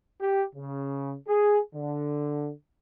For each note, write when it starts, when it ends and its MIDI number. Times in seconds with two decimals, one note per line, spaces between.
0.21 0.43 67
0.55 1.14 49
1.28 1.59 68
1.75 2.51 50